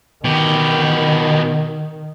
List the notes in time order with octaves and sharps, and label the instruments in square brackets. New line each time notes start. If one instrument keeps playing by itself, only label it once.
[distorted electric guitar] B2 G4 [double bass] D#3